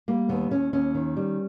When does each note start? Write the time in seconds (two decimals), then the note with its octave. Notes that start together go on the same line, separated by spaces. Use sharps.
0.08 G3 A#3
0.29 D#2 B3
0.51 D#2 C#4
0.73 D#2 C#4
0.94 D#3
1.17 G3